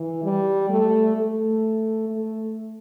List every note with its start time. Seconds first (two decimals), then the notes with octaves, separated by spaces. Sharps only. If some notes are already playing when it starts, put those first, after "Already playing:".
Already playing: E3
0.23 G3
0.69 A3
1.15 A3
2.08 A3